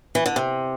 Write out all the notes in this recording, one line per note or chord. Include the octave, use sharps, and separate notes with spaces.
E3
D3
C3